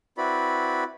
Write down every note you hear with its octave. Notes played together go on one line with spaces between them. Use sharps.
C4 E4 F#4 B4 D5 B5